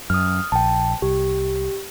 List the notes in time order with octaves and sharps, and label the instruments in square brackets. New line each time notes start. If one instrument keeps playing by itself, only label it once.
[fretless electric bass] F#2 [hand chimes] D#6 F6
[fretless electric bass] A#1 [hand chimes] G5 A5
[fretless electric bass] C2 [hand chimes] G4